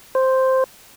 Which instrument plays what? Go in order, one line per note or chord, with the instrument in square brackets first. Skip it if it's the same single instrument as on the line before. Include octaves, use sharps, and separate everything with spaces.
[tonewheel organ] C5